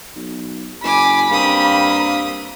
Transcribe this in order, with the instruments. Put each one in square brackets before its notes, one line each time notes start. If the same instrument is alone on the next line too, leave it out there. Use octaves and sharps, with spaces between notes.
[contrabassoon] B1
[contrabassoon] F#1 [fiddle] G#5 D6 [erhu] B5
[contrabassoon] G2 [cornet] A#3 [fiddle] C4 D#6